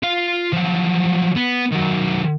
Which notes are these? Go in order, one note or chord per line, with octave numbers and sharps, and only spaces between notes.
F4 F5
F3 F#3
B3
D#3 F#3